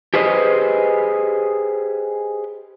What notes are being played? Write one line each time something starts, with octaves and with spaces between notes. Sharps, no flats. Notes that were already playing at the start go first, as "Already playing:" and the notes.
G4 G#4 B4 C5 D#5